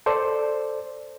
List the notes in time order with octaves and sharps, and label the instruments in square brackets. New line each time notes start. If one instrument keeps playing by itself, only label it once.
[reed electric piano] A4 C5 D5